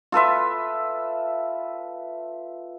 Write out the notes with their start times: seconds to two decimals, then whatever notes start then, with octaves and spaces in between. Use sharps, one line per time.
0.12 F4 A4 B4 E5